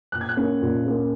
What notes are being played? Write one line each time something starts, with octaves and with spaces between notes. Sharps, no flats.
A#2 F#6
G#6
F#6
A#3 C#4
A#2
A#3 C#4